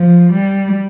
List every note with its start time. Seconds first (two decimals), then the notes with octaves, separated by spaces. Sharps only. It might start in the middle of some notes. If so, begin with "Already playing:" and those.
Already playing: F3
0.31 G3